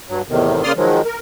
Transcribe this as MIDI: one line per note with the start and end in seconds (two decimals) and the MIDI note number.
0.08 0.22 43
0.08 0.22 54
0.28 0.63 40
0.28 0.63 45
0.28 0.63 48
0.28 0.63 51
0.63 0.72 49
0.63 0.72 58
0.63 0.72 74
0.63 0.72 84
0.63 0.72 87
0.63 0.72 89
0.76 1.02 51
0.76 1.02 53
0.76 1.02 54
0.76 1.02 56
1.06 1.19 70